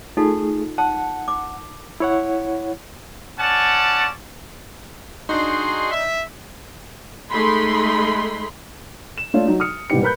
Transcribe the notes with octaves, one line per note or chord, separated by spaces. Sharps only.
A3 D#4 F4 G#4 A4
F#5 A5
D6
E4 C#5 F#5
C#4 D5 F#5 A5
D4 D#4 F#4 G#4 C6
E5
G#3 A3 D#4 B5 C6
E7
A3 D4 F4 C#5 D5
F#3 D#4 F#4
D#6 F6 C#7
G#2 B2 E3 G3 G4 C#7
A#4 B4 B5 F#6 G6